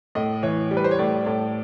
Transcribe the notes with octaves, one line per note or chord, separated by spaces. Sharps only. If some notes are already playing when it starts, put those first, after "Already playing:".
A2 D#5
E3 C#5
G3
B4
C5
C#5
A2 D5
A2